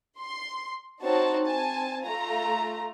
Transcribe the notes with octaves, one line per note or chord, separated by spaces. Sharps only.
C6
C4 D#4 F#4 C#5 A5
C4 G#5 A5
A3 F4 A#5